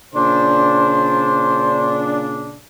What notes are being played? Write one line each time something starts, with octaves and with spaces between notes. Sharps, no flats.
A#2 C#3 D4 C5